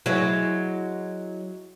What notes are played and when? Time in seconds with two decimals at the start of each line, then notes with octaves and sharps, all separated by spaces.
0.06 F#3 G#3 E4